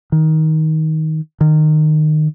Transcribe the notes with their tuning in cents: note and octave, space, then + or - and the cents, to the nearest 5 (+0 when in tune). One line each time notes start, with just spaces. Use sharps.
D#3 +15
D#3 -20